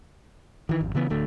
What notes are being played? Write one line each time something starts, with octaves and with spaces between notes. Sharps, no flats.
D#3 E3
G#1 F2
C#3 E3 B3
D1 D3 A3